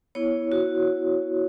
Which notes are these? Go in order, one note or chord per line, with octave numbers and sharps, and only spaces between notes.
B3 E4 C#5
F#4